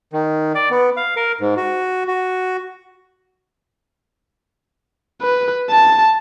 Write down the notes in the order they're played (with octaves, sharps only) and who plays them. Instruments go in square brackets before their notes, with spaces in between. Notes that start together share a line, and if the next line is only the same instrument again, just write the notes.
[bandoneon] D#3
D5
B3
F5
A#4
G#2
F#4
F#4
[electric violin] B4
A5